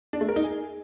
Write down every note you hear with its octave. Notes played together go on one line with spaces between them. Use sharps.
D4
A3
A#4
D#4
G#4